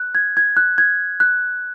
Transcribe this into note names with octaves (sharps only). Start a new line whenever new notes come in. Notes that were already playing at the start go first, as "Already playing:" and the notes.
Already playing: F#6
G#6
G#6
F#6
G#6
F#6